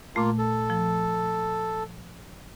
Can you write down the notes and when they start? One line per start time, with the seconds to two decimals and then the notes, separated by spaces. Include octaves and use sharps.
0.16 A#2 A3 A#3 F4
0.38 A4
0.70 F3